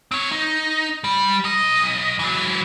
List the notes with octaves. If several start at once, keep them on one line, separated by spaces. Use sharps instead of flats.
C4 C#5
D#4
G3
B1 D#5
E3 F#3